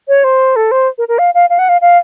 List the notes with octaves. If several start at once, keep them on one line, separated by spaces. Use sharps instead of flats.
C#5
C5
A4
C5
A#4
A#4
F5
F5
F5
F#5
F5
F5